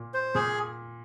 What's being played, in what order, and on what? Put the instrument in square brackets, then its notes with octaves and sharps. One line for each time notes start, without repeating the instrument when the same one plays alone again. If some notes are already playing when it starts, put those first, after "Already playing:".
Already playing: [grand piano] A#2
[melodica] C5
[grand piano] A#2 [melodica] G#4